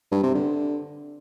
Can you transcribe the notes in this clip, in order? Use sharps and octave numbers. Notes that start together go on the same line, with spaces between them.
G2
C3
D3